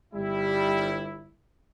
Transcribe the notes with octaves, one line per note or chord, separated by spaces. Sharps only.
G1 G3 E4